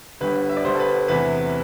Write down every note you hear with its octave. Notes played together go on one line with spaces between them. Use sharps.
G1 G2 D3 G3 B4
E5
D5
G1 G2 D3 G3 C5
A4
B4
E2 C3 E3 A3 B4